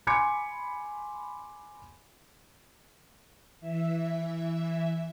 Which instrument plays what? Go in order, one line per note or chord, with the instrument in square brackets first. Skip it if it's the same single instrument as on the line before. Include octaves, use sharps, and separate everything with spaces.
[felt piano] G#5 B5 C6 D6 G#6 C#7
[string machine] E3 E5